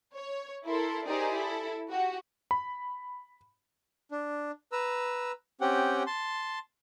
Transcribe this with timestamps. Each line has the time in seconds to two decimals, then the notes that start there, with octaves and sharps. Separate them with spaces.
0.14 C#5
0.65 E4 A4 A#4 C6
1.05 D#4 G4 G#4 A#4 C5 D5
1.35 E4 A4
1.89 F#4 G4
2.51 B5
4.11 D4
4.72 B4 A#5 E6
5.61 C4 C#4 G4 F#5 G5
6.07 A5 C6